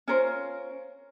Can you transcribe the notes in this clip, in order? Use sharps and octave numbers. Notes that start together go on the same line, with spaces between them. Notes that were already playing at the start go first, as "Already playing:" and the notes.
C#4 F4 A#4 C5